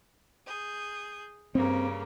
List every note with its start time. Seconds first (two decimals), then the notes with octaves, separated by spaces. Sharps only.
0.46 G#4 G6
1.55 G2 C#3 A#3 C4